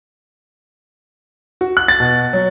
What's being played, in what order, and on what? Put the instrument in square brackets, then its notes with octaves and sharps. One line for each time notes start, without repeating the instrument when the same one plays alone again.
[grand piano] F#4
F#6
A6
B2
F#3